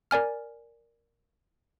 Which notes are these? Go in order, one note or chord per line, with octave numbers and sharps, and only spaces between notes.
A#4 D5 G#5 F6